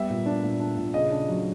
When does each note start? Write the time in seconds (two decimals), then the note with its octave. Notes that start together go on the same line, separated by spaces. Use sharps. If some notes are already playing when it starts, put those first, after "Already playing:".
Already playing: G3 B3 E5
0.10 A#2
0.26 D4
0.43 A#2
0.60 D4
0.77 A#2
0.94 C#3 D#5
1.11 D4
1.28 F#3